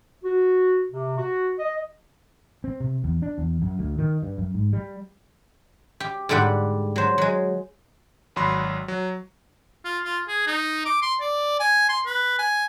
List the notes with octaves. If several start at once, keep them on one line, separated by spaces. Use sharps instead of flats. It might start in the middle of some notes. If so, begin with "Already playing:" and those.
F#4
C3
F#4
D#5
C4
C3
E2
D4
E2
F#2
D2
D#3
G2
F#2
G#2
G3
G4
G#2 D3 G3 G4 F#5
F#3 C5
F#3 G#3
G#1 F#3 F#4 B5 C6
F#3
F4
F4
G#4
D#4
D6
C6
D5
G#5
C6
B4
G#5